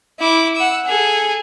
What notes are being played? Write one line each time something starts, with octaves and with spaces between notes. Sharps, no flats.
E4 D6
F#5 E6
G#4 A4